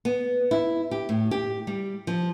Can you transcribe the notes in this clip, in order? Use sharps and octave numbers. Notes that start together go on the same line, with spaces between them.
B3
E4
G4
A2
G4
G3
F3